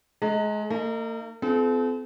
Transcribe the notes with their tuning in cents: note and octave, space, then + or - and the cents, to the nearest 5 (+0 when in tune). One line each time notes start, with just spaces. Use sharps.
G#3 +25 A#5 -30
A#3 -45 D#4 +0
C4 -40 F4 +0 A4 -40